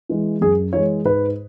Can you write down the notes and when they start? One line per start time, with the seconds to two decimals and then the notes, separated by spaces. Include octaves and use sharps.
0.09 E3 G#3
0.41 F#2 G#4
0.73 E3 G#3 C#5
1.05 G#2 B4